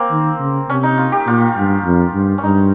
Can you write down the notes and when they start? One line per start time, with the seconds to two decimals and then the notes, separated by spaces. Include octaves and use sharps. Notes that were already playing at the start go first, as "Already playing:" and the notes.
Already playing: A#3 C4
0.11 D#3
0.40 C#3
0.69 C3 C#4
0.83 D#4
0.97 F4
1.12 G4
1.27 A#2 F4
1.57 G2
1.85 F2
2.14 G2
2.38 C#4
2.43 G2 D#4